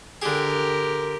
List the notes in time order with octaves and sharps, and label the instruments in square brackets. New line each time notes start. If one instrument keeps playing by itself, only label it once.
[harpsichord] D3 G#4 [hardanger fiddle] G4 A#4